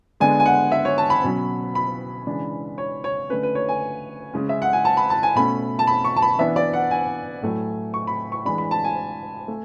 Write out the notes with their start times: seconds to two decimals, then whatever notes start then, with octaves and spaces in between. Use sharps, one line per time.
0.20 D3 G#3 B3 D4 G#5
0.40 G#5
0.46 F#5
0.72 E5
0.85 C#5
0.98 A5
1.10 B5
1.24 B2 F#3 C#4
1.75 B5
2.27 C#3 E3 G#3 D4
2.78 C#5
3.04 C#5
3.29 D3 A3 C#4 B4
3.43 B4
3.55 C#5
3.69 G#5
4.34 C#3 G#3 C#4
4.49 E5
4.62 F#5
4.73 G#5
4.85 A5
4.97 B5
5.10 A5
5.23 G#5
5.36 B2 A3 C#4 B5
5.79 A5
5.87 B5
6.05 C#6
6.16 A5
6.22 B5
6.39 E3 B3 D4 E5
6.56 D5
6.74 F#5
6.91 G#5
7.42 A2 F#3 A3
7.94 C#6
8.07 B5
8.32 C#6
8.45 E3 G#3 D4 B5
8.58 B5
8.71 A5
8.84 G#5
9.48 A3